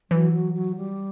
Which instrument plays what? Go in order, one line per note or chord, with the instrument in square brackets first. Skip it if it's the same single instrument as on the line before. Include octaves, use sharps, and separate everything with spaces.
[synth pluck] E3 [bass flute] F#3
[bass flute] F#3
F#3
G3